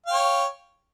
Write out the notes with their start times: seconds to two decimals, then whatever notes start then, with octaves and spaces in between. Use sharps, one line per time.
0.06 F5
0.10 G5
0.13 C#5